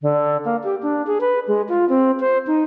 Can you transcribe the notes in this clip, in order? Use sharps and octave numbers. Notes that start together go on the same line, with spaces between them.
D3
A#3
G4
D4
G#4
B4
G#3
F4
C4
C5
D#4